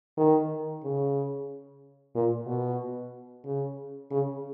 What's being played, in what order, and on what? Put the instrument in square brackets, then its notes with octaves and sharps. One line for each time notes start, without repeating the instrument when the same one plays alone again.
[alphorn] D#3
C#3
A#2
B2
C#3
C#3